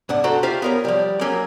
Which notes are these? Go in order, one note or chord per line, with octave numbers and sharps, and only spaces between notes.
C#2 G#2 D4 F#5
D4 F#4 A4 C5 F#5 A#5
F4 G4 C5 E5 F5
B3 A#4 C#5
F3 G3
F#3 A#3 C#4